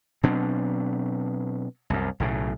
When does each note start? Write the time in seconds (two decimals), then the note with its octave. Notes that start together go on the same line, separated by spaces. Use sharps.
0.23 B2 F#3 C4 D4
1.90 C2 F#2
2.20 B1 A2 C#3